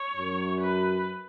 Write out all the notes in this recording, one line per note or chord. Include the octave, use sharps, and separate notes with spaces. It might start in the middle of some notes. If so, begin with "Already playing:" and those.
Already playing: C#5
F#2
B4